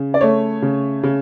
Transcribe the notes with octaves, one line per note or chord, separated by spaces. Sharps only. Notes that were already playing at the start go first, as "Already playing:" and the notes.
Already playing: C#3
D5
A3 C#5
C#3
C#3